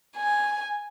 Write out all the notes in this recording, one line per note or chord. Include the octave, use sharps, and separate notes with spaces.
G#5